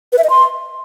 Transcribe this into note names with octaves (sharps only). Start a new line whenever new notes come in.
B4
E5
D#5
C6